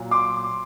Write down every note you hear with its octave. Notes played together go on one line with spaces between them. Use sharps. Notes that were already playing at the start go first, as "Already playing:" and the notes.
Already playing: A#2 F#3
C6 D6